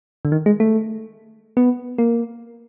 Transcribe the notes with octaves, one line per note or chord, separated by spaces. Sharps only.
D3
D#3
G#3
A3
B3
A#3